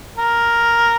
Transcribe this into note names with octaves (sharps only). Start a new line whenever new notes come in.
A#4